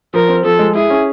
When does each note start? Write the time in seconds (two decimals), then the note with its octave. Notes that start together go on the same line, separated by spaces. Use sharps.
0.14 F3 A#4
0.29 C4
0.44 F3 A4
0.59 G#3
0.75 E4 G#4
0.90 C#4